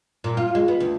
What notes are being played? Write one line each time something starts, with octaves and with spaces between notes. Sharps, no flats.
A#2
F4
G#3
B3
D2